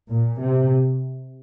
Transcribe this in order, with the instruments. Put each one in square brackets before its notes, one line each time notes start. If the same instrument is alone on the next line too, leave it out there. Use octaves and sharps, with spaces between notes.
[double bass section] A#2
C3